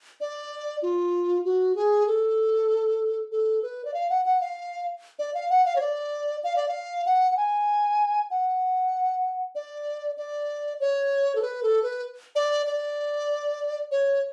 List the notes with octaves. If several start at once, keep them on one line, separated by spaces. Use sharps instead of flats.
D5
F4
F#4
G#4
A4
A4
B4
D5
F5
F#5
F#5
F5
D5
F5
F#5
F5
C#5
D5
F5
D5
F5
F#5
F#5
G#5
F#5
D5
D5
C#5
A4
B4
A4
B4
D5
D5
C#5